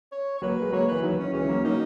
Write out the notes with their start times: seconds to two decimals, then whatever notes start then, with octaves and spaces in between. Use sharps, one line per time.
0.12 C#5
0.38 C#5
0.42 F#3 A#3 B4
0.62 G#3
0.72 F#3 A#3 C#5
0.88 E3 B4
1.02 D#3 F#3 D#4
1.19 C#4
1.33 E3 G#3 C#4
1.49 F#3 A#3
1.64 F#3 A#3 D#4